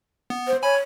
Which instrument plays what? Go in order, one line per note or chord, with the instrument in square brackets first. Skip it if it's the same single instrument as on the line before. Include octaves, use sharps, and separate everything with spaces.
[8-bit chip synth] B3
[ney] C5
[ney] C#5 [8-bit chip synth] G#5 B5